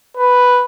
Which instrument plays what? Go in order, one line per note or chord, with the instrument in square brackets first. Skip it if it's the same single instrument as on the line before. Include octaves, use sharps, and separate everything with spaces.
[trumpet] B4